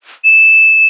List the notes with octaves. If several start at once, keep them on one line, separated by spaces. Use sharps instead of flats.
E7